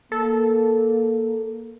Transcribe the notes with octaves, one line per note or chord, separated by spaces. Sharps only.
A#3 A4